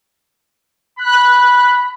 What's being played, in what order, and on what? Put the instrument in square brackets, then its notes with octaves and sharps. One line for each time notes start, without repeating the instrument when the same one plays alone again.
[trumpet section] B5 [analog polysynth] F#6